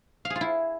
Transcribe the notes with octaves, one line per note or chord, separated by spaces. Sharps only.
F5
G#4
F4
E4